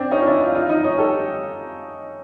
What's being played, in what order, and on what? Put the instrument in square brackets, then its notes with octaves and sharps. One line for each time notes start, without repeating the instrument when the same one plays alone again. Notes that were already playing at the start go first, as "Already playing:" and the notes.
Already playing: [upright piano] C4 D4
C#4 D#4
F4
D4 E4
D#4 F4
D#4 F4
D#4 F4
C#4 D#4
G4 A4